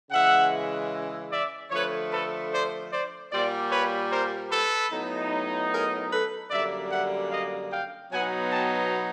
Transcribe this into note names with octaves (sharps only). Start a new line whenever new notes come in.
C#3 E3 G#3 E5 F#5
D5 E5
D3 F3 A3 B4 C#5
A4 B4
C5 D5
C5 D5
A#2 G3 A#3 C5 D5
B4 C#5
A#4 C5
A4 B4
A2 F#3 B3 D#4
G#4 A#4
A4 B4
F#2 D3 G3 A#3 D5 E5
E5 F#5
D#5 F5
F5 G5
B2 F#3 B3 D#4 F#5 G#5
G5 A5